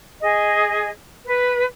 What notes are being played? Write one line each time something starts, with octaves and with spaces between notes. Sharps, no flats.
G#4 D#5
B4